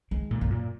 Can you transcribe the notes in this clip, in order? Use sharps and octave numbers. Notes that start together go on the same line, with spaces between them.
D#3 G#3
A#2
F#2
A#2